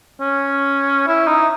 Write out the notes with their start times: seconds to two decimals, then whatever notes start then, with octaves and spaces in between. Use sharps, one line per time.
0.20 C#4
1.07 E4
1.27 D#4